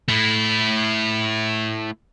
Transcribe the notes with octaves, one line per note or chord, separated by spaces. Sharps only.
A3 E4